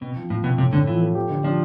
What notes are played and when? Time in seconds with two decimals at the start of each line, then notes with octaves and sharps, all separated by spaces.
0.01 B2 C4
0.16 F3
0.30 A2 F3
0.44 B2 C4
0.58 A2 C3
0.73 A2 D3
0.87 E3 F3
1.02 A3
1.15 G4
1.30 D3
1.44 F3 D4